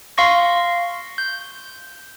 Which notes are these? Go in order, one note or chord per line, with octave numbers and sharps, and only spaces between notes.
F5 C6 C#6 A#6
G6